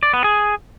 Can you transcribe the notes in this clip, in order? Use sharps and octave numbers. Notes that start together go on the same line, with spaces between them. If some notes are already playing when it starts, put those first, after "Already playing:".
D5
B3
G#4